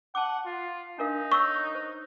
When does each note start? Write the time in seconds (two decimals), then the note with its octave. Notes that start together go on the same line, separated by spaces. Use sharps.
0.15 F#5 A5 D6
0.45 F4
0.99 D4 D#4 A#4 F5
1.32 C#5 C#6 E6
1.75 C5